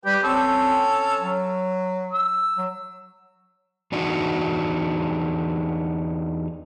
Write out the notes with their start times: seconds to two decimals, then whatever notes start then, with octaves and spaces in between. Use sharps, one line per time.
0.05 G3 G4 B4 G5
0.23 C4 C#4 A4
1.18 F#3
2.12 E6
2.58 F#3
3.92 E2 D4 D#4 F#4